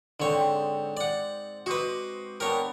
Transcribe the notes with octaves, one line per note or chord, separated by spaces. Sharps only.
G#2 D3 C4 C#5 G5
D5 F#5
F#4 B4 C5 D#5 D6
B3 D4 G4 A#4 C#5